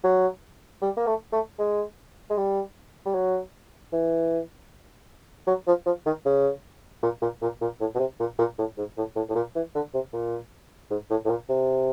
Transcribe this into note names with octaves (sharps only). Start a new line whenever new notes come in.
F#3
G3
A#3
A3
A3
G#3
G#3
G3
G3
F#3
E3
F#3
F3
F3
D#3
C#3
A#2
A#2
A#2
A#2
A2
B2
C3
A#2
A#2
A2
G#2
A2
A2
A2
A#2
E3
D3
C3
A#2
G#2
A2
A2
A#2
C3